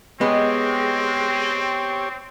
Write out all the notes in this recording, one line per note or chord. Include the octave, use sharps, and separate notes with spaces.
G#3 B3 C4 G4 C#5